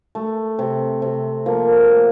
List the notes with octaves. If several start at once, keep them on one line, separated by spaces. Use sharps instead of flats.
A3
C3
C3
F3 A#3
A3